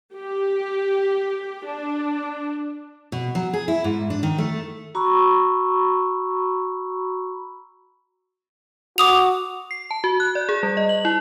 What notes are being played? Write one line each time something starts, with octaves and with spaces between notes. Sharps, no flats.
G4
D4
B2
F#3
G#4
E4
G#2
D4
D#3
A3
F#4 A#5 B5 C#6 E6
F#4 D6 D#6 F7
C7
A5
F#4
F#6
D5
G#4
G3
D#5
F#7
E4